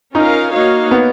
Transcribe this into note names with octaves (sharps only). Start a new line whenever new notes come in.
C#4 D#4 F4 A#4 F5
A#3 D#4 F#4 C#5 F5
B3